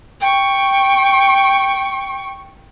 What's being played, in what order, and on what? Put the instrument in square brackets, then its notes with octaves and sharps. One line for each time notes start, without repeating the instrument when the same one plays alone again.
[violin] G5 C#6